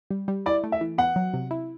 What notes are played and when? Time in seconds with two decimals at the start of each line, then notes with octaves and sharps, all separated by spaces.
0.11 G3
0.28 G3
0.46 E4 D5
0.64 A3
0.72 E5
0.81 E3
0.98 B3 F#5
1.16 F#3
1.34 C3
1.51 E4